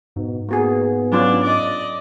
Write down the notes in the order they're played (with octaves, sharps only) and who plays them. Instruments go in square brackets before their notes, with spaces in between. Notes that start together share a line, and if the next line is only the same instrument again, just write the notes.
[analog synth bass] G#2 [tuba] B2
[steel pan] A#3 F#4 G#4 [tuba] B3
[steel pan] F#3 C#4 F4 [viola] D4
[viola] D5 D#5